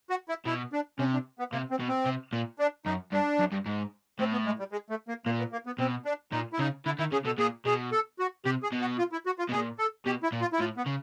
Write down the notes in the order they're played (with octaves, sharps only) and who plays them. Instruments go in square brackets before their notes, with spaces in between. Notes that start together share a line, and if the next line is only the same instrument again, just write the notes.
[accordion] F#4
E4
[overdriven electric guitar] B2 [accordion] E4
[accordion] D4
[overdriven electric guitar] C3 [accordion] C#4
[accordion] D4
B3
[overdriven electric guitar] C3 [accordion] A#3
[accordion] C4
[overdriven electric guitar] B2
[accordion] C4
[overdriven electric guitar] C3
A#2
[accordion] D4
[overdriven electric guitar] F#2 [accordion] D#4
[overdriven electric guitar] G2 [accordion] D4
[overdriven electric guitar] F#2
G2
G#2
[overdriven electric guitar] A2 [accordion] C4
[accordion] B3
G#3
G3
G#3
A3
A#3
[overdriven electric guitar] A#2 [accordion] A#3
[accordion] B3
A#3
B3
[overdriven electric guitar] B2 [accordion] C4
[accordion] D4
[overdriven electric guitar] A#2 [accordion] D#4
[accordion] E4
[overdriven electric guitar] C#3 [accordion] D#4
[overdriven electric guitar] D3 [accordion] E4
[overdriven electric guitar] D#3 [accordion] E4
[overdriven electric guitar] C#3 [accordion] G#4
[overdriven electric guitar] B2 [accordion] A4
[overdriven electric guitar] A#2 [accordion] G#4
[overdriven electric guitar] B2 [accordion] G#4
[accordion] A4
F#4
[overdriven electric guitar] C3 [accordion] G4
[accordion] G#4
[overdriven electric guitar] B2
[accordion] F#4
F4
E4
F#4
F4
[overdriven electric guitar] B2
[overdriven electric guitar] A#2 [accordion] G#4
[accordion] A4
[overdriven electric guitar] B2 [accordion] G4
[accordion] E4
[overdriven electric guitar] A#2
[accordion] F4
E4
[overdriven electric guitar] A2 [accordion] F4
[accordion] B3
[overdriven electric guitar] C#3